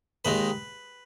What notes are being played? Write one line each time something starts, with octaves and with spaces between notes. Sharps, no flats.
D#2 D#3 G#3 B4